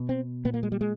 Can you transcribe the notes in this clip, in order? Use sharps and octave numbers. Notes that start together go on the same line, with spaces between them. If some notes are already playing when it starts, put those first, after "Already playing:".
Already playing: B2
C4
A#2 B3
A#3
G#3
G3
G#3